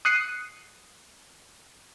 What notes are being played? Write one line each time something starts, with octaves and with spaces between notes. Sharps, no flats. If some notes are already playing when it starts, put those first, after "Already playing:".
D#6 F#6 C7 C#7 D#7